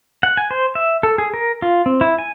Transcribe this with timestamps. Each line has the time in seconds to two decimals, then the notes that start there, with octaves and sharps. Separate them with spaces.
0.23 F#5
0.37 G#5
0.51 C5
0.75 E5
1.03 A4
1.18 G#4
1.34 A#4
1.62 F4
1.86 C4
2.01 E4
2.18 G#5